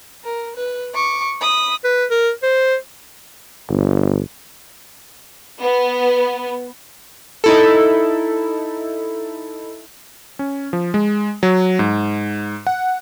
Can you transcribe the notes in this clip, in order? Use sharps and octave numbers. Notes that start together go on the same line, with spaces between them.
A#4
B4
C#6 D6
B5 D#6
B4
A#4
C5
G1
B3
D#4 E4 A4
C#4
F3
G#3
F#3
G#2
F#5